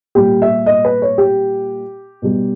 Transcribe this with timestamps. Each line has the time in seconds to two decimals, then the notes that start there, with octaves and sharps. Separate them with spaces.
0.15 A#2 G3 G4
0.42 E5
0.66 D#5
0.85 B4
1.02 C#5
1.18 G4
2.22 B2 G3